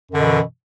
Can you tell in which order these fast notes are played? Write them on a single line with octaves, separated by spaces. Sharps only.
F#2 D3 B2 E3